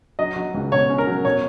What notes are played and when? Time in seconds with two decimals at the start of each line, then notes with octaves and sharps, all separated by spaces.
0.19 F#3 D#5
0.36 F#3
0.54 C#2
0.72 B2 C#5
0.90 C#4
0.98 A#4
1.07 F#3
1.25 B2 C#5